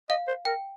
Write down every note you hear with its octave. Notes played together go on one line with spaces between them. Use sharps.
D#5 F5
C5
A#4 G5